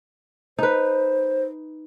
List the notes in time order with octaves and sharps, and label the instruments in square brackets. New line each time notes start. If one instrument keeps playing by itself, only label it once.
[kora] D#4 B4 [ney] C5